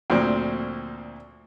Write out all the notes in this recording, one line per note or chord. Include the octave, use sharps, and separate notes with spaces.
D2 A#2 F3 C4